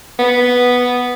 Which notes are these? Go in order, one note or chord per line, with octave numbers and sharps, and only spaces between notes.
B3